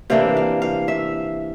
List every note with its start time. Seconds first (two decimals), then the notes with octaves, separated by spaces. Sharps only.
0.10 C3 E3 A#3 D4 F5
0.37 F5
0.62 F5
0.88 E5